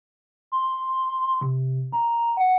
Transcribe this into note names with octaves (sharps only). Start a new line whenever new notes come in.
C6
C3
A#5
F#5